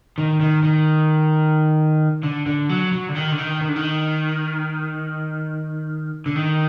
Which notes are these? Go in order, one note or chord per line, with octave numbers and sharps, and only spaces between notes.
D#3
D#3
D#3
D3
D3
F#3
F#3
D3
D#3
D3
D#3
D#3
D3
D#3
D3
D#3